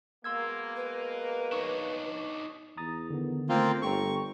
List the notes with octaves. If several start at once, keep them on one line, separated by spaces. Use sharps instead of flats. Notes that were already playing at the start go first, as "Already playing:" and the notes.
B2 G#3 A#3 C6 E6 G#6
B4
D4 D#4 C#5 C#6
E2 A#5 D#6 A6
D3 D#3 B3
A3 A#3 C4 F4
G1 A4 G5 A#5 C#6